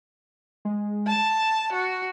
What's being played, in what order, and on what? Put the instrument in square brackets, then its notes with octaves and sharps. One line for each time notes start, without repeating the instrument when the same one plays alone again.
[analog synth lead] G#3
[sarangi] A5
[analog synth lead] A6
[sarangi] F#4